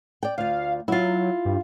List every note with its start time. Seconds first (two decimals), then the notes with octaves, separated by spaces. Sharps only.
0.23 D5 G5
0.38 D2 F4 F5
0.88 F#3 E4 F4
1.45 G2